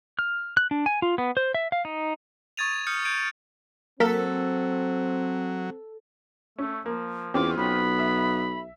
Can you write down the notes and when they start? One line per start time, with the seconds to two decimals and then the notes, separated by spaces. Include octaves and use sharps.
0.19 F6
0.57 F#6
0.71 D4
0.86 G#5
1.02 F4
1.18 B3
1.37 C5
1.54 E5
1.72 F5
1.85 D#4
2.57 C#6 D#6 G#6 A6 D#7 F7
2.72 D#7
2.87 D#6 F6 G6 C#7
3.05 G6 G#6 D7 D#7
4.00 F#3 A#3 C4 A4 A#4 B6
6.59 A3 C#4
6.86 F3 A#3
7.34 E2 C4 C#4 F4 D6
7.57 B1 B3 B5
7.99 E5